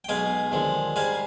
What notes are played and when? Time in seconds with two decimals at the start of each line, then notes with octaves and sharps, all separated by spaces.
0.04 G5
0.09 B1 B2 G#3 F5 G#5
0.52 D#2 D3 F3 G#3
0.96 G#2 G3 F5 G#5